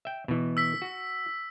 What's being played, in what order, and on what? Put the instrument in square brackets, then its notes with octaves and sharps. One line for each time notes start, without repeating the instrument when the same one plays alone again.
[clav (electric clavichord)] E5 G5
B2 E3
[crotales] E6 B6
[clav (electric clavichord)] F#4